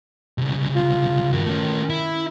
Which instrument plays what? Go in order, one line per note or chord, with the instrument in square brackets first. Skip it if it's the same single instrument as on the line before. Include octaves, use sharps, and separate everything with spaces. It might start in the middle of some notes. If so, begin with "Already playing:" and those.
[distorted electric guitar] C2 C#3
[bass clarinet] F4
[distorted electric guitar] G2 F#4 [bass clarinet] D#3
[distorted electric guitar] A3 C#4
E4